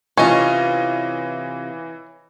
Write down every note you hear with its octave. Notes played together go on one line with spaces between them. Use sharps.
C3 E3 C#4 F4 D#5